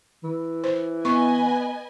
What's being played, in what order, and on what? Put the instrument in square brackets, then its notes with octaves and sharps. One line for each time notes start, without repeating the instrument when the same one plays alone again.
[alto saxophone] E3
[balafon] C5
[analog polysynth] B3 [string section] B4 D#5 G#5 [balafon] C#6